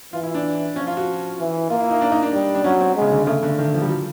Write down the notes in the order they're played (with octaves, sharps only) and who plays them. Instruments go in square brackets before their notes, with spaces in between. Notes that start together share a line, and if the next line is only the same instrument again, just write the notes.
[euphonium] E3 [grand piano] F4
[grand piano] E4
D4
[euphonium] F3 [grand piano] C#4
[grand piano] F4
F#4
[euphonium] E3
[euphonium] A#3 [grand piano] F4
[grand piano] E4
D#4
D4
D#4
D4
[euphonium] G3
[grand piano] D4
[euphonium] F#3 [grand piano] C#4
[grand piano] C4
[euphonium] G#3
[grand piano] C#3
D3
[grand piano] C#3 [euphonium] A3
[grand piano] D3
D#3
F3
G3
F#3